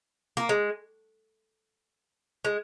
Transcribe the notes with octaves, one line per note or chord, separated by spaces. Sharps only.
A#3
G#3
G#3